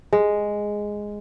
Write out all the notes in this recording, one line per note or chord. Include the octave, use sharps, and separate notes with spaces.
G#3